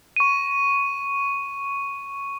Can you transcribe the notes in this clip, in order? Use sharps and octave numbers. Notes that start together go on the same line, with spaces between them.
C#6 D#7